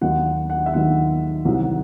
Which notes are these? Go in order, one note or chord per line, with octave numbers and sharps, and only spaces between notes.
D#2 D#3 F#3 F#5
F#5
E5
D#2 D#3 F#3 F#5
C2 C3 D#3 F#3